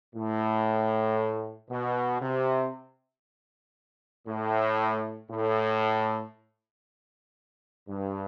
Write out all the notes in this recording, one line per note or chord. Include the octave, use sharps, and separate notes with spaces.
A2
B2
C3
A2
A2
G2